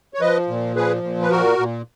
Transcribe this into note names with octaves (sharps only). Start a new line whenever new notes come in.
C#5
F3 B4 D#5
A#2
F3 G#4 B4
A#2
B4
A#2 F#4 A#4
A#2